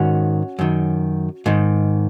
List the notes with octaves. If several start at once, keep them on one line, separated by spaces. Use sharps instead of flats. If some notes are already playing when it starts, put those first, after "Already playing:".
Already playing: G#2 D#3 C#4 F#4
F#2 D#3
G#2 D#3